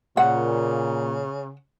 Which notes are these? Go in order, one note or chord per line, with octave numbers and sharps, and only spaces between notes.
A#2 C#3 F#5